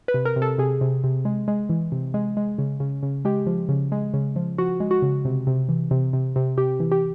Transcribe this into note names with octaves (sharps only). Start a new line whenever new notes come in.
B4
C3
A#4
C3
A4
C3 G#4
C3
C3
G#3
G#3
E3
C3
G#3
G#3
C#3
C#3
C#3
G#3 G4
F3
C#3
G#3
C#3
F3
F3 F#4
G#3
F#4
C#3
C3
C3
E3
C3
C3
C3
C3 G4
E3
G4